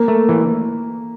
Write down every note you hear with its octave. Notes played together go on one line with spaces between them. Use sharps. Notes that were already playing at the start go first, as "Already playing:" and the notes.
Already playing: A#3
A3
E3